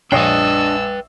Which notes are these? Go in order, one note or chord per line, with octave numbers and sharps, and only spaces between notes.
A#1 D4 B4 C#5 D#5 G5 E6 C7